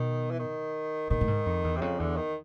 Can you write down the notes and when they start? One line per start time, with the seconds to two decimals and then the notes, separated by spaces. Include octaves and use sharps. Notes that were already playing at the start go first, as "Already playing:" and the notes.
Already playing: B2 D#3
0.31 E3
0.39 D#3
1.10 A#2 D#3
1.21 A2
1.28 G#2
1.46 F2
1.64 E2
1.76 C3
1.81 F2 C#3
2.00 E2 D3
2.17 D#3